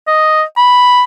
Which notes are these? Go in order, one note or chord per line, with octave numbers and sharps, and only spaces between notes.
D#5
B5